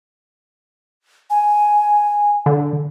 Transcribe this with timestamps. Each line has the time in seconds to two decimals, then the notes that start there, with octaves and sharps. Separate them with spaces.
1.30 G#5
2.46 D3